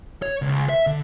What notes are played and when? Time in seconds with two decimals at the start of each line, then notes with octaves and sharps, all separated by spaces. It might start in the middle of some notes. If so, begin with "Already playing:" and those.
0.22 C#5
0.42 C#2
0.69 E5
0.87 D3